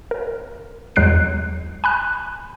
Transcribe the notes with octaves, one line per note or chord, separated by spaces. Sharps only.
A#4
E2 F#3 G#3 F#6 C7 D7
G#5 B5 F#6